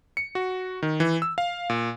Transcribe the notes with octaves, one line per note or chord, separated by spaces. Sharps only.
C#7
F#4
D#3
E3
E6
F5
A#2